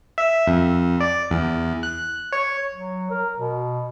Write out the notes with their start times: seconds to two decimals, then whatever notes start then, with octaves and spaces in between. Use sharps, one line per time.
0.18 E5
0.47 F2
1.01 D5
1.31 E2
1.83 F#6
2.33 C#5
2.74 F#3
3.10 A#4
3.39 B2